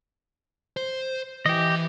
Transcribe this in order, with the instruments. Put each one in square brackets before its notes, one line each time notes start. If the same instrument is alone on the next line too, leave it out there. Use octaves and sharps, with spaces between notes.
[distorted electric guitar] C5
[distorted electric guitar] E3 [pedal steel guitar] G4 D#5